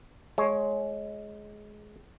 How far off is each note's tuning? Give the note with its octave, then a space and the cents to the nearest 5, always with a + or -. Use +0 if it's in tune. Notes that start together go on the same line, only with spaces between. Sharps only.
G#3 +15 C#5 +0